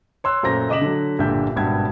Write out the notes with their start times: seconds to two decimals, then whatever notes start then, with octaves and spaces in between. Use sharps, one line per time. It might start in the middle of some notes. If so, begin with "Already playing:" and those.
0.24 C#5 C6 E6 F#6
0.43 F#2 A#2 A3 C5 A#5 A#6
0.69 C#3 D#5 D6 B6 E7 F#7
0.81 D3 F#3
1.18 G1 A#2 D3 G4 E5 G6
1.56 G#1 G2 B2 E5 G5 G#6